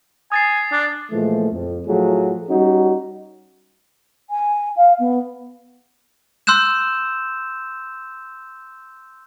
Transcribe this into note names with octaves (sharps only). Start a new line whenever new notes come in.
G#5 D#6 A6 C7
D4
A#2 E3 F3 G#3 A3
F2
A2 F3 F#3 A3 G#4
G3 C#4 D#4 F#4
G#5
F5
B3
C6 E6 F#6 G6 E7